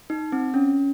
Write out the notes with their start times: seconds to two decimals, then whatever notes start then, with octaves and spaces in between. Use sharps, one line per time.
0.10 D#4
0.32 C4
0.54 C#4